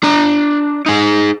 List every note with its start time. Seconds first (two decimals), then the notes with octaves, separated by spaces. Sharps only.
0.03 D4 A#5
0.86 D#4 G#4